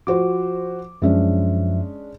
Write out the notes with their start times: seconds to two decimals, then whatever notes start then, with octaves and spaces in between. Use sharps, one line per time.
0.07 F3 F#4 C5 D6
1.02 F#2 F3 G#3 C#4 D4 E5